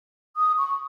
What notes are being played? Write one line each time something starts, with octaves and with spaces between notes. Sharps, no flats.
D#6
C#6